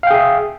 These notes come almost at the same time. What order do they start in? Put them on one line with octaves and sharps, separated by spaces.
F5 G5 G#4 E5